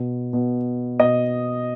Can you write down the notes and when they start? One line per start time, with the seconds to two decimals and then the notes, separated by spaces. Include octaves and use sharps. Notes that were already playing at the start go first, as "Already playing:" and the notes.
Already playing: B2
0.33 B2
0.99 B2 D#5